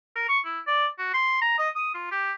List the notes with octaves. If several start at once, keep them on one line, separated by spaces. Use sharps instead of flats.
A#4
C#6
E4
D5
F#4
C6
A#5
D#5
D#6
F4
G4